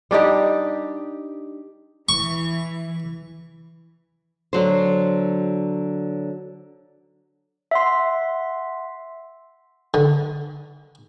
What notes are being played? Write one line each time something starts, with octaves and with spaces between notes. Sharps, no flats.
G3 D4 D#4 G4
E3 C#6
D3 F#3 C5
E5 F#5 C6
D3